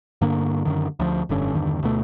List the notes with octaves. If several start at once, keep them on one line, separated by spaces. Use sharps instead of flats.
G2 D3 A#3
F#2 D3 D#3
D2 F3
F1 G2 D3 C#4
E2 G2 D3 D#3
D2 B2 A3